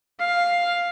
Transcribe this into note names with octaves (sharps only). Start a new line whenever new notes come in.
F5